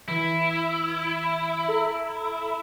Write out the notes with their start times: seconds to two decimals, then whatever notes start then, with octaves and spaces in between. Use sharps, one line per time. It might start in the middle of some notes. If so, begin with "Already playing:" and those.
0.08 E3 E4
1.68 A4 A#5